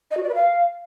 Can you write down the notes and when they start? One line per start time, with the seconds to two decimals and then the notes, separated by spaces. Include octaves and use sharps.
0.11 D#5
0.17 F#4
0.23 D5
0.29 B4
0.35 F5